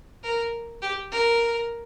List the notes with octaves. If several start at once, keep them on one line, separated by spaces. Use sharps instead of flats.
A#4
G4
A#4